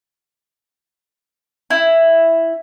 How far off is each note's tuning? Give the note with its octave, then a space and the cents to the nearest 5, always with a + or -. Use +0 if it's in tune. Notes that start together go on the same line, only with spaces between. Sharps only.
E4 +0